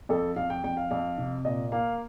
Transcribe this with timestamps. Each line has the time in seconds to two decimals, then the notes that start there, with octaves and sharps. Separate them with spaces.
0.09 F2 A4
0.36 F2 F5
0.50 G5
0.64 F2 G5
0.77 F5
0.91 F2 F5
1.18 C3
1.45 A#2 D#5
1.72 A#3 F5